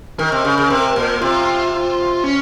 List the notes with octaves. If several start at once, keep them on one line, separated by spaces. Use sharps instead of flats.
D#3 A#4
C3
C#3
C#3
C3
A#2
C3 F4
C#4